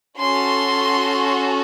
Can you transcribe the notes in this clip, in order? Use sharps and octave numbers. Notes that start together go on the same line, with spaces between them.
C#4 F#4 A4 C6